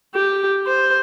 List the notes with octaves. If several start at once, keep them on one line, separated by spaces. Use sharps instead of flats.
G4
C5